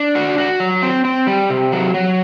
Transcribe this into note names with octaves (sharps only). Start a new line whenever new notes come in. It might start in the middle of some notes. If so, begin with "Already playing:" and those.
Already playing: D4
F#4
F#4
F#3
C4
C4
G3
C3
F#3
F#3